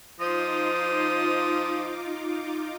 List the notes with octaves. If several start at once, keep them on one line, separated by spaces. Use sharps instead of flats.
F3 D#4 F4 C5 D6 D#6